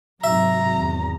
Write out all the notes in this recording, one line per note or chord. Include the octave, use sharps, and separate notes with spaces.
G#2 C3 F#3 E5 A#5
G#1 E2